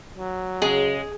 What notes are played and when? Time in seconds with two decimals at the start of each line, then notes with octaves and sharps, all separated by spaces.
0.18 F#3
0.62 C#3 G#3 G#4